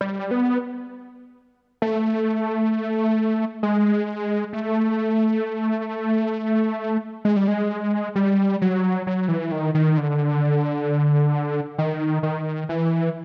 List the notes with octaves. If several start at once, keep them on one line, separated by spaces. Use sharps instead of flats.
G3
B3
A3
G#3
A3
G#3
G3
G#3
G3
F#3
F#3
E3
D#3
D#3
D3
D#3
D#3
E3